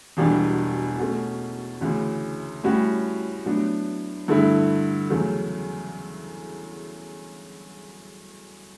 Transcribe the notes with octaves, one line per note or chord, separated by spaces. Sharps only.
E1 E2 B2 G3 D4
B2 A3 C#4
D2 C#3 E3
A2 G3 C#4 F#4
A2 F#3 B3 D4
G2 D3 A3 E4
E2 C#3 F#3 A3